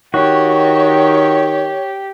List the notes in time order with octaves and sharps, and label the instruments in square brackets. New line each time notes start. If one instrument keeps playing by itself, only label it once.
[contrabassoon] D#3 [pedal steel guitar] F#4 [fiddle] G4 [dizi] C#5